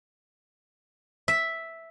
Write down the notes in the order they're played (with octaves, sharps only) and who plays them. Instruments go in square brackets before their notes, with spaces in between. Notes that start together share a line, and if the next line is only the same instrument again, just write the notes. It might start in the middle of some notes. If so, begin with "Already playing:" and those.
[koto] E5